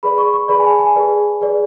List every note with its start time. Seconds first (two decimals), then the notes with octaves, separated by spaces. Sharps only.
0.03 G#4 B4 D5 B5
0.18 C#6
0.33 C#6
0.48 G#4 B4 D5 B5
0.59 G#5
0.65 A5
0.79 G#5
0.96 G#4 B4 D5
1.41 G#4 B4 D5